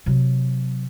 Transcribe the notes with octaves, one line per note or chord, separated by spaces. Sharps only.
C3 F#3